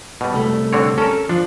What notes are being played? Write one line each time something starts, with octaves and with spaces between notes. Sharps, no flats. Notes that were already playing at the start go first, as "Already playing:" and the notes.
B2 G3
C2 A3
D3 C4 C#5
C#4 A4 A#4
F3 D4